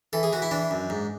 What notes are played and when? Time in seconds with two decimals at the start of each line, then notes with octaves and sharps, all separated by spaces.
0.13 E3 A4
0.23 G#4
0.32 E3 F#4
0.42 E4
0.51 E3 D4
0.71 F#2
0.90 G#2